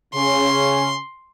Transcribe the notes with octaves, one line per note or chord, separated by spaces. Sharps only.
C#3 C#4 C6